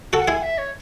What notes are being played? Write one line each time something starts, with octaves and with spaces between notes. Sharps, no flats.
F#4 A4 A5
F#5
E4 G#4 G#5
E5
C#5